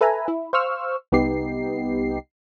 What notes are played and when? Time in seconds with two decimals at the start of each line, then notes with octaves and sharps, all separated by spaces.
0.01 A4 B4 E5 G#5 A#5
0.28 E4
0.53 C5 F5 C#6 E6 F6
1.12 C2 B3 D#4 G4 C7